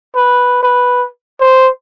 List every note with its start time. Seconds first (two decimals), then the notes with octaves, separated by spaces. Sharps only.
0.16 B4
0.63 B4
1.40 C5